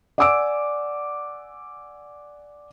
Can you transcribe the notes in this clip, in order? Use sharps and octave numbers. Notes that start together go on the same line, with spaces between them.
D5 F#5 G#5 D6 E6 D7